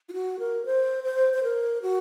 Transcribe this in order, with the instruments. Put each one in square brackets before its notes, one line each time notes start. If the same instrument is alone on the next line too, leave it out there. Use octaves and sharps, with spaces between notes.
[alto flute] F4
F#4
A#4
C5
C5
C5
A#4
F#4